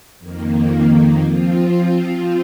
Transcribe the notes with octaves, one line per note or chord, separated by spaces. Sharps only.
F2 D#3 A#3
F3 C4 F4